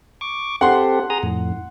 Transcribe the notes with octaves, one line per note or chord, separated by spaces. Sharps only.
C#6 D6
C4 G4 A4 F#5 C6
G#4 A#5 D#6
F2 A2